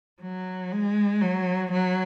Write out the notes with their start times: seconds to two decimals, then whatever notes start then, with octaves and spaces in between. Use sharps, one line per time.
0.22 F#3
0.72 G#3
1.21 F#3
1.72 F#3